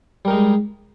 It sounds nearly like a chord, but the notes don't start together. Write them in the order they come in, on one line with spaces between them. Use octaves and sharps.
G3 A#4 D#4 G#3